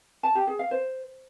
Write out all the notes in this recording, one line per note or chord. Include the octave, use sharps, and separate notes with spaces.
A5
G4
G#4
F5
C5